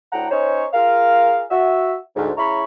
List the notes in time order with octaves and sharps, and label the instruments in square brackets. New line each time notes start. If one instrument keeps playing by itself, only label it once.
[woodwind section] D2 A2 F#5 G5 A#5
C#4 D#4 C5 C#5
F4 G#4 A#4 F5
F#4 E5
D2 G#2
C#3 E4 C#5 A#5 B5 C#6